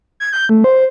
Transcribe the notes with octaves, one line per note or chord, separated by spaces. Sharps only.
G#6
G6
A3
C5